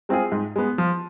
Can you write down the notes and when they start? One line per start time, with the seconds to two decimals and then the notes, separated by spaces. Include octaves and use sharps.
0.09 G#3 C4 F4 G#4
0.32 G#2
0.56 G#3 B3
0.78 F3